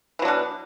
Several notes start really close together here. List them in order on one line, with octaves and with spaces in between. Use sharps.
E3 F#3 D4 B2